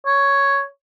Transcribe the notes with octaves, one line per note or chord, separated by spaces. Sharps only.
C#5